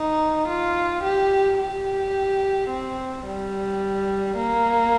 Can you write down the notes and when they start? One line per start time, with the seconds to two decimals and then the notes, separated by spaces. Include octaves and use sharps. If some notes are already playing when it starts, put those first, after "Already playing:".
Already playing: D#4
0.48 F4
1.03 G4
1.59 G4
2.70 C4
3.25 G3
4.36 A#3